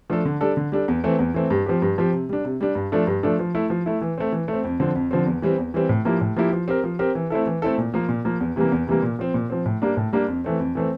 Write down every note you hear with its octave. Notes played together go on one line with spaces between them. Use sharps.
F3 A3 D4 A4
D3
G3 D4 A4
D3
G3 D4 A4
E2
E3 A3 C4
E2
E3 A3 C4
G2
F3 C4 G4
G2
F3 C4 G4
C3
G3 D4
C3
G3 D4
G2
F3 A3 D4 A4
G2
F3 A3 D4 A4
F3
A3 E4
F3
A3 E4
E3
A3 C4
E3
A3 C4
F2
D3 F3 C4
F2
D3 F3 C4
E2
E3 G3 C4
E2
E3 G3 C4
A2
F3 A#3 E4 G4
A2
F3 A#3 E4 G4
F3
C4 G4 A#4
F3
C4 G4 A#4
E3
A3 C4 E4 A4
E3
A3 C4 E4 A4
A#2
F3 A#3
A#2
F3 A#3
E2
C3 E3 G3 A#3
E2
C3 E3 G3 A#3
A#2
F3 C4
A#2
F3 C4
A2
G3 A#3 D4
A2
G3 A#3 D4
F2
E3 A3 C4
F2
E3 A3 C4